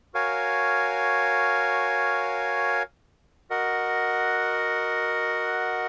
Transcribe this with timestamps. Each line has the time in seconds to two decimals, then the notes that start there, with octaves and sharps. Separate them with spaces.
0.14 F#4 A#4 C#5 F5 G#5
3.50 F#4 A#4 D#5 F#5